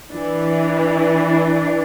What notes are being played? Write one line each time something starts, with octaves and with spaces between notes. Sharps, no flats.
E3 D4